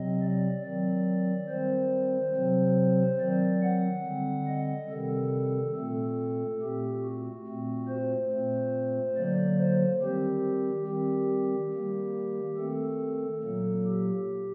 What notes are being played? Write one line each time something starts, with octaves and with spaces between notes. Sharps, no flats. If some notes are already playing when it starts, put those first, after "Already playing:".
Already playing: C3 F#3 C4 D#5
D5
D#3 F#3 C4 D5
D#3 G3 C4 C5
C3 F#3 C4
D#3 F#3 C4 D5
F#5
D3 G3 C4
D#5
C3 D#3 G3 C4 A4
A#2 A3 C4 A4
A#2 A3 C4 G4
F#4
A#2 A3 C4
C5
A#2 A3 C4
D3 F#3 A#3 D5
C5
D#3 G3 C4 G4
D#3 G3 C4 G4
D#3 G3 A#3
D#3 A3 C4 A4
A#2 F#3 A#3 A4
G4